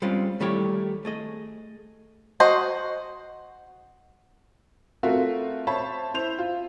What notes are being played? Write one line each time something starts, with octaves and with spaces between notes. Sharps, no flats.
G3 G#3 C4 C#4 F4
D#3 G3 A3 E4 G4 C#5
A3 G#4 D#5
F#4 C5 D#5
A3 C4 F4 F#4 A#4 E5
C5 C#5 E5 A5 B5
E4 C5 F7
F4